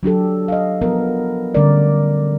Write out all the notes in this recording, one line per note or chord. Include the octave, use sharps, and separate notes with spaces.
F#3 D4 G4 A4
D#5 F5
F3 F#3 B3 A#4
D3 G3 A3 C#4 A#4 D5